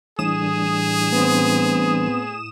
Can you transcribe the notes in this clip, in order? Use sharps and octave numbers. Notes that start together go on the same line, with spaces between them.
A2 E3 G3 D4 G#4 D#6 E7
B3 C4